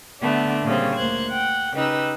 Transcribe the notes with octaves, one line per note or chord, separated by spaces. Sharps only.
D3 A3 B3 D4
A#2 C#3 G3 C4
D2 A#3 C5 F#6 G#6
F#5 G5
C#3 D#4 G4 B4 E6